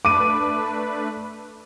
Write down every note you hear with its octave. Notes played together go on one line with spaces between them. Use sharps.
A3 D4 B4 D6 D#7